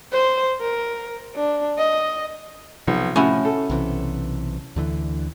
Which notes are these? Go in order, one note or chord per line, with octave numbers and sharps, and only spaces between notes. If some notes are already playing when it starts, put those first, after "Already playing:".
C5
A#4
D4
D#5
B1 C3 F3
A2 C#4 E4 F#4
A4
B1 C3 E3
D2 D3 E3